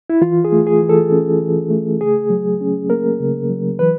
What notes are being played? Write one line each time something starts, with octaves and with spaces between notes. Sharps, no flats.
E4
E3 F4
G#4
A3
G#4
E3
A4
C#4
E3
A3
C#3 G#4
F#3
C#4
A#3 A#4
C#3
F#3
E3 B4